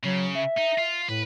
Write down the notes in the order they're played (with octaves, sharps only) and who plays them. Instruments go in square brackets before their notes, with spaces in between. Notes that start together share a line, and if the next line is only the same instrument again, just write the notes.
[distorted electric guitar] C#3 [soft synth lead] F#3
[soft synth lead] E5
[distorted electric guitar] D#4
F4
[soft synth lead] A2 [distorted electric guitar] B4